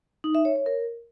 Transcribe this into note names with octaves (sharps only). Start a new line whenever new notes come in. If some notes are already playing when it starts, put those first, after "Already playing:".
D#4
E5
C#5
C#5
A#4